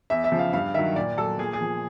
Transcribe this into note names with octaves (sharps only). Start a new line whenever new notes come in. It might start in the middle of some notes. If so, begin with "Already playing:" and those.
E2 E5
E5
C#3 F3
F5
G2 F5
D#3 F#3 E5
A#2 D5
F#3 A4
A#2 G#4
G#4
F3